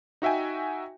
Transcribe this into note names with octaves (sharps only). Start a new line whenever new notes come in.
D#4 F#4 E5 G5 G#5